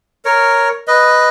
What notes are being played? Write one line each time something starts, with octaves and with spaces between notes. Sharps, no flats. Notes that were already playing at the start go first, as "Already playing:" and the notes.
A#4 C#5
B4 D#5